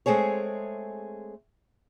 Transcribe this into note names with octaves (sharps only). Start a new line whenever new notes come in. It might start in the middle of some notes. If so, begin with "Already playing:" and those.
G#3 A3 C4 G#4 C#5